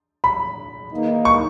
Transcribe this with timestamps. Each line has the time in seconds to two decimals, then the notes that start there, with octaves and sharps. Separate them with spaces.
0.24 B5
0.92 E2 D#3 A#3 D#4
1.25 C#6